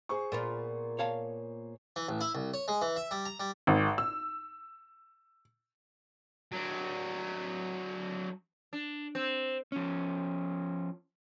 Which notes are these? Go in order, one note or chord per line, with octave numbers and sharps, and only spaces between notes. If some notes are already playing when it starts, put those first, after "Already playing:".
G#4 C5 C#6
A#2 B3 F4
C#5 F5 A5
E3
A1
E4
C2
C#5
G#3
E3
E5
G3
A#5
G3
G#1
E6
F#3 D4
D4
C4
F3 C#4